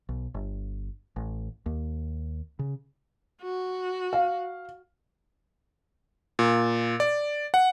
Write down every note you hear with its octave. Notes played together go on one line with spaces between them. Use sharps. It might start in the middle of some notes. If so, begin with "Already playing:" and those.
B1
G1
A1
D#2
C#3
F#4
F5
A#2
D5
F#5